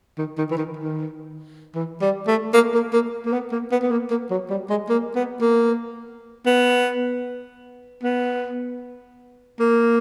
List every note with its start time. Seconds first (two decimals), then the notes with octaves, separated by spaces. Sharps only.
0.18 D#3
0.38 D#3
0.51 E3
0.57 D#3
0.77 D#3
1.75 E3
2.01 G3
2.27 A3
2.54 A#3
2.74 A#3
2.93 A#3
3.25 A#3
3.33 B3
3.52 A#3
3.71 B3
3.82 B3
3.91 A#3
4.10 A#3
4.31 F#3
4.50 G3
4.70 G#3
4.89 A#3
5.15 B3
5.41 A#3
6.46 B3
8.03 B3
9.60 A#3